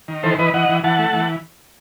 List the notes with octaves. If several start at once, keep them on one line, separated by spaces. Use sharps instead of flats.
D#3
E3 A4 C5
E3 B4 D#5
E3 D#5 F#5
E3
E3 F#5 A5
A3
E3